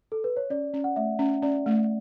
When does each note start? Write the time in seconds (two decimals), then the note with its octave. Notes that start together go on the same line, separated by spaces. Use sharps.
0.12 A4
0.24 B4
0.37 C#5
0.50 C#4 D5
0.74 C#4
0.84 F#5
0.96 A3 E5
1.19 C#4
1.42 C#4 D5
1.66 A3